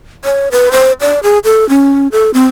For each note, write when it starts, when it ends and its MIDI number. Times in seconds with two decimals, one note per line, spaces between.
0.25 0.49 73
0.52 0.69 71
0.72 0.92 72
1.01 1.19 74
1.23 1.38 68
1.44 1.67 69
1.69 2.08 61
2.12 2.31 69
2.34 2.45 60